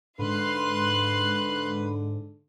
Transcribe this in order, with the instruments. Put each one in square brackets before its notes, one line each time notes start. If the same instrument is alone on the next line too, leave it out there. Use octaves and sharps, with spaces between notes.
[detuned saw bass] G#2 [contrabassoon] D3 [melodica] B4 [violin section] F5 C6 F#6